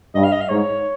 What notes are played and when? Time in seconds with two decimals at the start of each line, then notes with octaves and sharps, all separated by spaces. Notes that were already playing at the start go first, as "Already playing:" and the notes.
0.15 G2 D#5
0.24 F5
0.32 D#5
0.41 F5
0.49 G#2 C#5